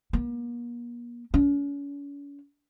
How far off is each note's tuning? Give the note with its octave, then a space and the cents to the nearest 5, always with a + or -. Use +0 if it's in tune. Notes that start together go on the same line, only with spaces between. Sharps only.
A#3 +45
C#4 +40